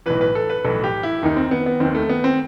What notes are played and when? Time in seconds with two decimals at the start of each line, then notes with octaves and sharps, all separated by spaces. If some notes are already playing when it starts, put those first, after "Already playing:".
0.06 B1 A2 E3 B4
0.21 B4
0.35 A4
0.50 B4
0.65 B1 A2 E3 A4
0.84 G4
1.03 E4
1.23 D#2 D#3 D#4
1.36 C4
1.51 B3
1.66 B3
1.80 D#2 D#3 C4
1.95 A3
2.09 B3
2.24 C4